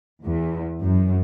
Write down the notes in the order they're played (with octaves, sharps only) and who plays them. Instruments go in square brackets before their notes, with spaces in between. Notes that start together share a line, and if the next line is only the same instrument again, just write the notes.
[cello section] E2
F#2